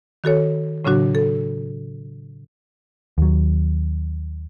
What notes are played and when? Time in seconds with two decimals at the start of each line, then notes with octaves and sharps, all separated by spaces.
0.24 D#3 F#4 A4 C#5
0.85 A2 C#3 F#3 D4 F#4
1.15 A4
3.18 D#2 F#3